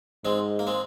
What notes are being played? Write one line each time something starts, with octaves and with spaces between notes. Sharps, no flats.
G#2 G#3 C4
A#3
G#3 C4